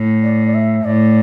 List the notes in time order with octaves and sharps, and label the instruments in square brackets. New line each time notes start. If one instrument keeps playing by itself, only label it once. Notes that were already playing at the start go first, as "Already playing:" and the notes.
Already playing: [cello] A2
[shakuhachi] D5
D5
E5
[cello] A2 [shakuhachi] D5